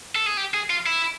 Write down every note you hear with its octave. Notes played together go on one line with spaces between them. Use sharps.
A4
G#4
G4
G#4
F4
E4